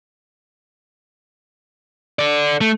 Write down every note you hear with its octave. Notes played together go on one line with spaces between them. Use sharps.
A4 D5
A3